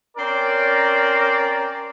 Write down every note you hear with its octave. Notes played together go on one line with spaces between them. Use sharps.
C4 C#4 A#4 D5